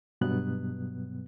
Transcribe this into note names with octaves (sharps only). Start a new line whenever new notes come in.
G2 B2 F#3 B3 F#6